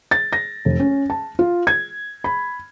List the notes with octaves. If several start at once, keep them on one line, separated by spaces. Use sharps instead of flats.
A6
A#6
F1
C#4
A5
F4
G#6
B5